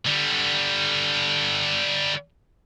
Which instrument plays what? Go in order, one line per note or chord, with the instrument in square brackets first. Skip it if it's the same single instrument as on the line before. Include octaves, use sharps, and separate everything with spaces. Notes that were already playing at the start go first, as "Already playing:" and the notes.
[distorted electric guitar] D3 G3